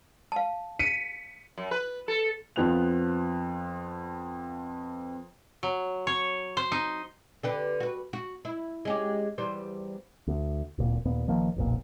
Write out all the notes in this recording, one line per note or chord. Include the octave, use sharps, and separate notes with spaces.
F5 A5
B6 C#7 D#7
F#2
B4
A4
F2 F3 B3 F#6 F7
F#3
C#5
C5
D#4
D3 G4 B4
F#4 B4
F#4
E4
G#3 C#4 G4
E2 G3 C5
D2
D1 A#2
D#2 A#2 B3
A1 D#3 F3 A#3
F1 B1 A#2